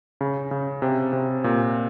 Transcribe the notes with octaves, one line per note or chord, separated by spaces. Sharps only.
C#3
C#3
C3
C3
A#2